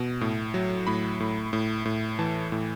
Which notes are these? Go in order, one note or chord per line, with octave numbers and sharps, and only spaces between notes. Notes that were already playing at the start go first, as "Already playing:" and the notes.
Already playing: B2
A2
F#3
A2 B5
A2
A2
A2
E3 A5
A2